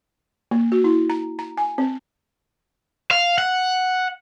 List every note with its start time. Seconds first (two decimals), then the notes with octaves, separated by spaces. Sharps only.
0.51 A#3
0.72 F#4
0.84 E4
1.10 A#5
1.39 A#5
1.57 G#5
1.78 C4
3.11 F5
3.38 F#5